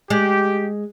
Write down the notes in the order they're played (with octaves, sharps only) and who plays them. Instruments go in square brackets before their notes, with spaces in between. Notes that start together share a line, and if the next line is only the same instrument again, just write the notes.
[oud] G#3 [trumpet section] G4